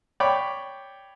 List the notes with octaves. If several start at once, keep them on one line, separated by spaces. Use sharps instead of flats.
C#5 D5 G5 B5 D6